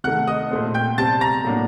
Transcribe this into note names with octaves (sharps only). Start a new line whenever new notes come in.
C3 D#3 A3 F#5 F#6
D#5 D#6
A#2 A3 C4
G5 G6
C3 G3 C4 A5 A6
A#5 A#6
A2 F#3 A#3 D4